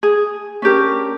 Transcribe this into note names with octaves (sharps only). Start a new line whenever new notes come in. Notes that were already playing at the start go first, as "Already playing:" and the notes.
G#4
C#4 D4 G4 A#4